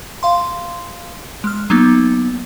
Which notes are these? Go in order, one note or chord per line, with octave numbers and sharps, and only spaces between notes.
F5 C6
G#3 F6
F#3 A#3 B3 D#4